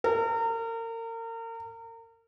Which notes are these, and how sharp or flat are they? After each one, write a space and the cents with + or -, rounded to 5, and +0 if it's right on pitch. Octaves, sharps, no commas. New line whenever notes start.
A#4 -35